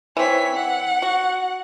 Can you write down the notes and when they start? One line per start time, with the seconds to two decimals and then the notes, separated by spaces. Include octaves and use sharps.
0.17 E3 C4 C#5 B6
0.54 F#5
1.02 F#4